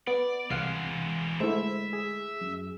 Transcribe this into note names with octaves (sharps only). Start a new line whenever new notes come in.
B3 D5
C2 E3 G#3 F5 F#5 C7
G#3 A3 E4 C5 E5
G#4
F#2